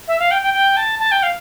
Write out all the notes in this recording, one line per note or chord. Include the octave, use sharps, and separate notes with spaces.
E5
F5
G5
G5
G5
A5
A5
G5
F5